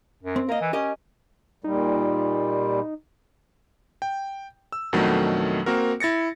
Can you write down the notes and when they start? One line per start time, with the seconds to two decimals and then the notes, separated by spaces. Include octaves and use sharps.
0.23 F#2
0.36 C4
0.49 A#3 A#4 D#5
0.61 E3
0.73 C#4 G4 A#4 D#5
1.64 A#2 G3 D#4
4.02 G5
4.72 E6
4.93 F2 B2 D#3 F#3 A3 D4
5.66 A#3 C4 F#4 A#4
6.00 E4 A6 A#6 C#7